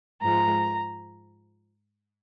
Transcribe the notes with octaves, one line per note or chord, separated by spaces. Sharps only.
G#2 F3 G#3 A#5